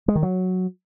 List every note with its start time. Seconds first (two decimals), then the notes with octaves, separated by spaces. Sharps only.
0.08 G#3
0.15 D#3
0.23 F#3